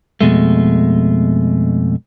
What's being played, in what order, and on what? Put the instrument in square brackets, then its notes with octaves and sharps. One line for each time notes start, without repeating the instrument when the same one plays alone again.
[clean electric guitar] F2 B2 G#3 A3